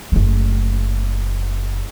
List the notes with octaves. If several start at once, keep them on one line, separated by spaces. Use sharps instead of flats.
F#1 A3